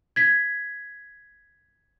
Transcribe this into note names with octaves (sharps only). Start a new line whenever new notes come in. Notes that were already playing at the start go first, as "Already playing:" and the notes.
G#6 B6